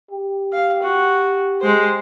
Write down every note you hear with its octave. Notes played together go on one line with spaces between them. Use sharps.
G4
F5
F#4
G#3 C5